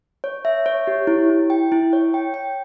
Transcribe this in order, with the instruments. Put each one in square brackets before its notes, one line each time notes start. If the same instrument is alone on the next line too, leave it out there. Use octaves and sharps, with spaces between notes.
[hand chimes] C#5
E5
C#5
G4
E4
E4
G5
E4
C#5
G5
G5